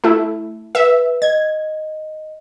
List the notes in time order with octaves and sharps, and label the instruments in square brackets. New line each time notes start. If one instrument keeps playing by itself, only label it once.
[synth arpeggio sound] A3 E4
[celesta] B4 [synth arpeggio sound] E5
[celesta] D#5 [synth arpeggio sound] G#6